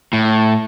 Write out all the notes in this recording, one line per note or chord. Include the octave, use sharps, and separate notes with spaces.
A2